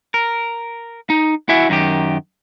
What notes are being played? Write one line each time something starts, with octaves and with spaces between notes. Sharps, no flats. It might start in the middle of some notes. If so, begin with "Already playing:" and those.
A#4
D#4
E4 F#4 E5 F#5 G#5
F#2 D#3 G4